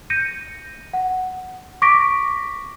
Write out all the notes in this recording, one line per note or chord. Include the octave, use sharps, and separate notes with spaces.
G6 A#6 C#7 D#7
F#5
C#6 D6 A#6 B6 D7